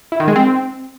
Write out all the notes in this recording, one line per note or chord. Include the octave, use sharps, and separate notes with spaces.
E4
D#3
G#3
C4